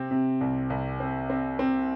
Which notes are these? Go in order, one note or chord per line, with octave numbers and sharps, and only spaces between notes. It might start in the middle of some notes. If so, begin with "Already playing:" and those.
Already playing: C3 C4
C3
C2
C2
C4
C4
C4